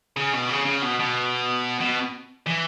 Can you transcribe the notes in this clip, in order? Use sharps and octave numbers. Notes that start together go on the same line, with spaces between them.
C#3
B2
C#3
C#3
B2
B2
B2
E3